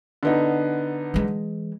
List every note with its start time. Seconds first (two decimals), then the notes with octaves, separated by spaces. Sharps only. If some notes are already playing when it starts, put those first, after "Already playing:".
0.23 D3 B3 D#4
1.14 E3 G#3